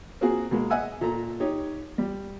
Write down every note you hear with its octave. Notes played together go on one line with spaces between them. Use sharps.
A#3 C4 F4 F#4 G#4
B2 G#3 A#3
D#5 E5 F#5 G#5 E6
A#2 A4 A#5
D#4 G4 C#5
G3